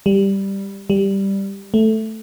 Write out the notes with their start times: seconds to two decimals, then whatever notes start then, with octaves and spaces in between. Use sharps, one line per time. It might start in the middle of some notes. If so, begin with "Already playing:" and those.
0.06 G3
0.90 G3
1.74 A3